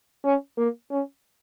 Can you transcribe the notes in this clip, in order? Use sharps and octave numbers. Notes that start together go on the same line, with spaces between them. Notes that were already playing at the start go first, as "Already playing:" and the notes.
C#4
A#3
C#4